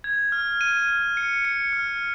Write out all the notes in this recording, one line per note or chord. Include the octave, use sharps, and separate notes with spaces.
G#6
F6
D#7
F6
C#7
C#7
F6